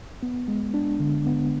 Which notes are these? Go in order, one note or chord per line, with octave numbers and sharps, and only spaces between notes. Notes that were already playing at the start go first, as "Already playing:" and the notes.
B3
G#3
D4
D3
B3